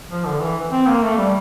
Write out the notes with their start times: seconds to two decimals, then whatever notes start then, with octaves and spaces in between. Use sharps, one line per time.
0.10 F3
0.26 D3
0.41 E3
0.71 C4
0.87 A#3
1.03 A3
1.17 G3